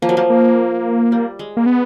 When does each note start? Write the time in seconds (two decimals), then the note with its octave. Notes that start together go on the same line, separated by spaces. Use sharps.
0.02 F3 A#3
0.09 F#3
0.17 F3
0.30 A#3
1.12 G3
1.39 G#3
1.57 A#3
1.66 B3